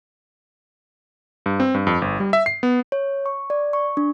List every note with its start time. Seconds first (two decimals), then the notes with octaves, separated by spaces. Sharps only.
1.46 G2
1.60 C4
1.74 G2
1.87 F2
2.02 G1
2.20 G3
2.33 E5
2.46 C7
2.63 B3
2.92 C#5
3.26 C#6
3.50 D5
3.73 C#6
3.97 D4